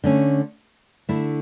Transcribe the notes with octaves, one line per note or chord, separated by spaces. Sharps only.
D3 A3 C#4
D3 A3 E4